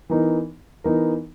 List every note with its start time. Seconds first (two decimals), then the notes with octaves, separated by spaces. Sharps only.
0.10 E3 B3 D#4 A#4
0.84 E3 B3 D#4 A#4